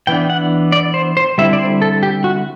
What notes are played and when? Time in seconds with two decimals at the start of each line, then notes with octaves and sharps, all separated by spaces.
0.07 E3 B3 D4 G5
0.30 F#5
0.72 D5
0.94 C5
1.17 C5
1.38 D3 G3 C4 E4 E5
1.53 D5
1.59 C5
1.82 A4
2.03 G4
2.24 F#4